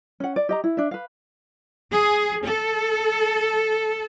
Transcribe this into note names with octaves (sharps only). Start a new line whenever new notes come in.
C#4 F#5
D5
G4 D#5 A#5
E4
D4 E5
B4 F5
G#4
A4